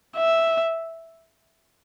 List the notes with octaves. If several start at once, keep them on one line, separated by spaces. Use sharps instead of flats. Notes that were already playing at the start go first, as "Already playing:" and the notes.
E5